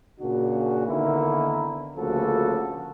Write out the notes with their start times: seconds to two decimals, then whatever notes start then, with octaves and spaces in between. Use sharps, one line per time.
0.20 A#2 C#3 D4 F#4
0.86 D3 D#3 A#3 B3 D#4 E4
1.97 D2 C#3 F3 A#3 F#4 A4